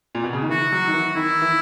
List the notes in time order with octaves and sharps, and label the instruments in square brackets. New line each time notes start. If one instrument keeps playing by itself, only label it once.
[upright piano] A#2
B2
C#3
D#3
[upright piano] E3 [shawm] F#4
[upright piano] F#3
D#3
E3
[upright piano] D#3 [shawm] E4
[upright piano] E3